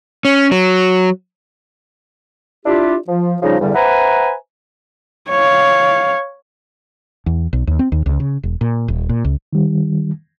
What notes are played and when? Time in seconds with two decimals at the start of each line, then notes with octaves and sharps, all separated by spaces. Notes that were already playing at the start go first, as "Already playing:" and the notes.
0.25 C#4
0.51 F#3
2.65 D4 E4 F4 G4
3.08 F3
3.42 C#3 F3 G3 D#4
3.60 E2 G2 D3 G3
3.74 B4 C5 E5 F#5 G#5 A#5
5.30 C#5 F5
7.26 E2
7.53 B1
7.67 D#2
7.79 C4
7.92 D#2
8.06 C#2
8.20 C#3
8.43 E1
8.61 A#2
8.88 D#1
9.09 A#2
9.25 C#2
9.53 D#3 G3